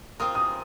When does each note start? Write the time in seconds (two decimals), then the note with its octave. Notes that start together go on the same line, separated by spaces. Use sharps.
0.19 C4 F4 A#4 D#6
0.35 D#6